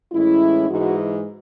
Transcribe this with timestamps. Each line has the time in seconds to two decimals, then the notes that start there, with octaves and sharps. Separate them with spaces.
0.12 A2 E3 G#3 C#4 E4
0.69 G#2 E3 G#3 D#4 F#4